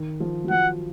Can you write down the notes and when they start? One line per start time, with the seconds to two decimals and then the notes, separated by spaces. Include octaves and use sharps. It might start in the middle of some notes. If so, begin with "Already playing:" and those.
Already playing: D#3
0.20 F3
0.44 F#3
0.50 F3 F#5